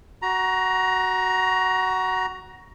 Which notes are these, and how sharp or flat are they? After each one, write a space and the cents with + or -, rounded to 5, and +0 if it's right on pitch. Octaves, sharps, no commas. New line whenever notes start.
F#4 +10 A#5 +20